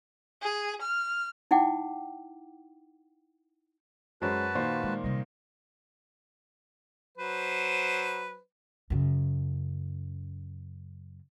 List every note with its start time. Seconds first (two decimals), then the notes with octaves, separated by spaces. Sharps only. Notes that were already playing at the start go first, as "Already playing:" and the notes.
0.42 G#4
0.81 F6
1.51 D#4 E4 F#5 G5 D6
4.22 F#2 G#3 C#4 F#4 B4 C5 A5
4.55 A#2 D#3 A#3 C5
4.83 G#3
5.04 C3 G3 D#5
7.18 F#3 B4 C5
8.90 F#2 C#3